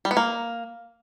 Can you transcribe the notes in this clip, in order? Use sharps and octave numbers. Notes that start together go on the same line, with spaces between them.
G3
B3
A#3